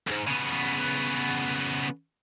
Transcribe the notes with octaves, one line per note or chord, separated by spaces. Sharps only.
C2 G#2
C#3 B3